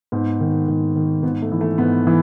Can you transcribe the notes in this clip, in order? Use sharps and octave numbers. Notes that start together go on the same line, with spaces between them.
G#2 B3
D#3
G#2
D#3
G#2 B3
A3
E3
A3
G#2 B3
E3